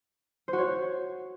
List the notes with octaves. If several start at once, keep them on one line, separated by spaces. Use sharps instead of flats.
C5
F#4
C#5